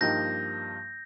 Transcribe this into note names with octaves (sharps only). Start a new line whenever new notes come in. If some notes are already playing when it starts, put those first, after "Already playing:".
G2 F3 A#3 D#4 G4 G6 A#6